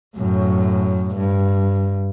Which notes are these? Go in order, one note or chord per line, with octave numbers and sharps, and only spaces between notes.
F#2 A2
G2